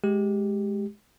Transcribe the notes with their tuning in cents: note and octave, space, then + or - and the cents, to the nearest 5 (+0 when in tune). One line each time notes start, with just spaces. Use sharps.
G#3 +15 G4 +0